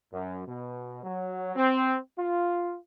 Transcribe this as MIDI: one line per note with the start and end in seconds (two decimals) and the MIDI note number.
0.13 0.46 42
0.48 1.01 47
1.03 1.52 54
1.56 1.97 60
2.19 2.77 65